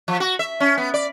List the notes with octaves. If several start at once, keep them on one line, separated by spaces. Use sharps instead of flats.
F3
F#4
E5
C#4
B3
D5